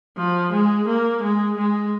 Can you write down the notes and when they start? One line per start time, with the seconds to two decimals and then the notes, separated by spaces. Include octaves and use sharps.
0.17 F3
0.52 G#3
0.87 A#3
1.23 G#3
1.57 G#3